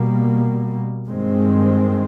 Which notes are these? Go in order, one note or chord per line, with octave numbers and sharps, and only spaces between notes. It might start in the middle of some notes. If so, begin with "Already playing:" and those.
Already playing: B2 G3 A#3
G2 D#3 G#3 C4